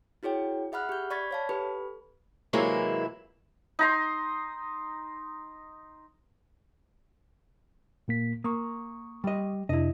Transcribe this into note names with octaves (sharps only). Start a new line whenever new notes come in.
E4 F#4 G#4 C#5 G5
G#4 E5 F#5 B5 F6 F#6
G4 G6
D5 B5 C#6 G#6 A6 B6
C#5 F5 A5
G4 A4 B4 B5
C3 E3 F#3 G#3 A#3 E4
D#4 A#5 C6
A#2 A#3 B6
A#3 C#6 D#6
G3 D#5
F2 C3 D4 E4 D#5